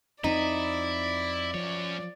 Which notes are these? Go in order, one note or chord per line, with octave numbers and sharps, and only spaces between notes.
F2 C4 D#4 E4 D5
F#2 F3 C#5